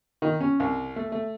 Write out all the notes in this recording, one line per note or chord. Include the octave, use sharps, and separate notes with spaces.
D#3
C#4
C2
A3
A3